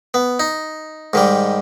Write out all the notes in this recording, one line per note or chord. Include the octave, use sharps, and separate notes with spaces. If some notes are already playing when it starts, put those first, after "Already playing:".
B3
D#4
G#2 D#3 G3